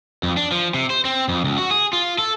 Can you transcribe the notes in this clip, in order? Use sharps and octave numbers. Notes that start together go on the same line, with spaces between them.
F2
D4
F3
C3
C5
C4
F2
C#2
F#4
G#4
F4
A4